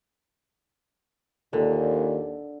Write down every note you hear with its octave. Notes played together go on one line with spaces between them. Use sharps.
D#2 A#2 D3